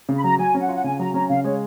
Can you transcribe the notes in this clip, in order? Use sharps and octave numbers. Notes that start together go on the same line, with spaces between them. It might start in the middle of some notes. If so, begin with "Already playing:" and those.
C#3
B5
F#3 A#5
F#3 G#5
C#4
F#5
F4
F#5
C#3 G#5
F#3 A#5
C#4 A#5
C#3 F5
G#3 C#5